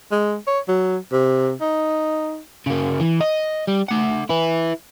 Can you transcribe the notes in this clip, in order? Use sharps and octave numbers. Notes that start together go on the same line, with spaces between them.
G#3
C#5
F#3
C3
D#4
C#3 A#3
E3
D#5
G3
A3 F#5
E4 B4